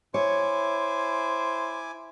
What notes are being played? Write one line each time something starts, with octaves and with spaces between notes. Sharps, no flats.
E4 C5 C#5 G#5 D6